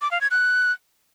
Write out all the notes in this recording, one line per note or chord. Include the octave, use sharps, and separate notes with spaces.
D6
F5
G#6
F#6